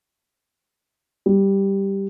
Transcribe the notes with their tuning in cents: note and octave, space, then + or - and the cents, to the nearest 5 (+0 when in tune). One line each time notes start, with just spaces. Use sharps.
G3 +0